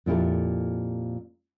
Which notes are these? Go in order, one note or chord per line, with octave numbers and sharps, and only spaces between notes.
F2 A#2 E4 G4 A4